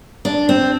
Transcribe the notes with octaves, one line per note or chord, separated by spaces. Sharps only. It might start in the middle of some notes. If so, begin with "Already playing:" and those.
D4
C4